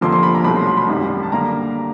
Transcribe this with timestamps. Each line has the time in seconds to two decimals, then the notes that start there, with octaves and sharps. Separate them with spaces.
0.01 F1 F2 D3 F3 A#3 C6
0.12 C6
0.23 B5
0.35 A#5
0.44 C2 B2 F#3 A3 B5
0.56 C6
0.67 C6
0.77 B5
0.88 G#1 F#2 D#3 G3
1.23 A5
1.32 D3 G3 A#3 A#5